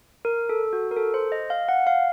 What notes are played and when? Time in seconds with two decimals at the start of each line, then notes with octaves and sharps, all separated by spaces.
0.25 A#4
0.49 A4
0.73 F#4
0.91 A#4
0.97 A4
1.14 C5
1.32 D#5
1.50 F5
1.69 F#5
1.87 F5